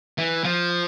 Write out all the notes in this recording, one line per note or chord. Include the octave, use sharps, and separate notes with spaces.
E3
F3